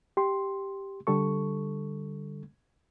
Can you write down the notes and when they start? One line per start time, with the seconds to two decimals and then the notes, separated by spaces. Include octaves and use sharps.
0.17 G4 C6
1.07 D3 G3 A4 C#6